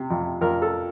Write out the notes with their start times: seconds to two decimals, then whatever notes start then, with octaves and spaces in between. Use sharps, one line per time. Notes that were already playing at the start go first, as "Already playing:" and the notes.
Already playing: C3
0.10 F2
0.41 F2 A#4
0.62 A4